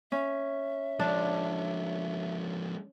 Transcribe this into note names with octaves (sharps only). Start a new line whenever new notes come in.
C#4 E5
F3 G#3 D4